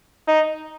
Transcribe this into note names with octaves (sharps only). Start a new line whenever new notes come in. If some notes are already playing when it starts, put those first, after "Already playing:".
D#4